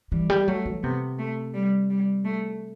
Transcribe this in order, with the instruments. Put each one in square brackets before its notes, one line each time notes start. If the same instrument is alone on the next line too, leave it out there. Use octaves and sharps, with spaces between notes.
[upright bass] E3 [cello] G3
[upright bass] G3
[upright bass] F#3 [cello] A3
[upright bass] E3
[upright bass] C3 [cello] B3
[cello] A3
G3
G3
A3